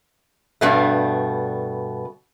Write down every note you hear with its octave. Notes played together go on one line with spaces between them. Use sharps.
G2 B2 A3